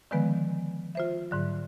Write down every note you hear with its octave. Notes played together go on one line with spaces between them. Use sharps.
D3 D#3 F3 G#3 B3 B4
F4 C5 E5
G#2 D3 F#3